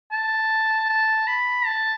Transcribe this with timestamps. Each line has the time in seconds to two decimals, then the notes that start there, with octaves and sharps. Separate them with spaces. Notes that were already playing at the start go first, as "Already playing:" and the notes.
0.12 A5
0.89 A5
1.27 B5
1.66 A5